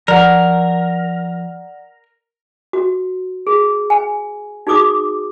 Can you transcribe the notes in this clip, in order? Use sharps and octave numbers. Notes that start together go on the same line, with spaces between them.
F3 A#4 D5 F#5
F#4
G#4
G#5
D#4 F#4 G#4 D6 D#6